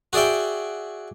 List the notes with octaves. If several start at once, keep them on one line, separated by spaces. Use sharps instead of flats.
F#4 G#4 D5 E5 G5